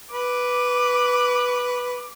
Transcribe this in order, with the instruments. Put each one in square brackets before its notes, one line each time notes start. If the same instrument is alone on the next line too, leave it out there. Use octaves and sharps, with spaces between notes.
[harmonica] B4 [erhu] D6